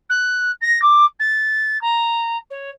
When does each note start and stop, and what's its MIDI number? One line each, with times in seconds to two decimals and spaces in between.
0.10 0.51 90
0.61 0.82 94
0.82 1.05 86
1.19 1.80 93
1.81 2.37 82
2.50 2.70 73